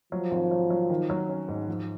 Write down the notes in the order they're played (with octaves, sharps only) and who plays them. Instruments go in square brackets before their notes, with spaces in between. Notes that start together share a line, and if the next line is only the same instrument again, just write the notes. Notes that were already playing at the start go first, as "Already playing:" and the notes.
[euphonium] F3 [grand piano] F#3
[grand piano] G#1
F#3
F#3
D#3
F#3
C#4
G#2
F3